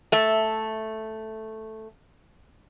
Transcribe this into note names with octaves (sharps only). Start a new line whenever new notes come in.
A3 E5